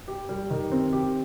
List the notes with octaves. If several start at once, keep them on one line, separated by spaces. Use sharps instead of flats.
G4
G3
D#3
C4
G4